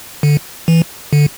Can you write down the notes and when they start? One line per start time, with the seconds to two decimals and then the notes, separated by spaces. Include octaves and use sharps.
0.23 D3
0.68 E3
1.13 D3